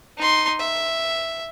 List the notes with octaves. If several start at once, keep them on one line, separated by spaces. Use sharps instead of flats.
D#4 C6
E5